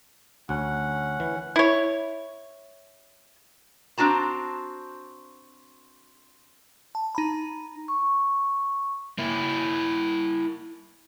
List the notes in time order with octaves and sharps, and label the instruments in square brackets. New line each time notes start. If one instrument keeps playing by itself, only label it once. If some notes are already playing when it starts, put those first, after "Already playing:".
[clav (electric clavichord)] D2 [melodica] C#4 F#5
[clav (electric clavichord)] E3
[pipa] E4 C#5
[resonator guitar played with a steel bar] C4 D4 F#4 A5 A#5
[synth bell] A5
D#4 A#5 B5
[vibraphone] C#6
[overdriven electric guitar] A#3 E4